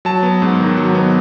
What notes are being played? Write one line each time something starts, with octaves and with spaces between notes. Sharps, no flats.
F#3 A5
B3
G#2
D#3
F#3
B3